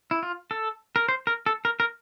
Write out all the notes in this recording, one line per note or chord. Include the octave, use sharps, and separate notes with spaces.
E4
F4
A4
A#4
C5
A#4
A4
A#4
A#4